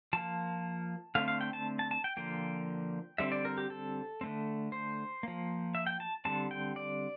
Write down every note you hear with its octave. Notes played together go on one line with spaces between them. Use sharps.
F3 A#3 A5
D3 A3 C4 F5
F5
G5
A5
A5
A5
G5
D3 F3 A#3 G5
D3 G3 C4 E5
D5
A#4
G4
A4
D3 A3 C4
C5
F3 A#3
E5
G5
A5
D3 G3 C4 A5
G5
D5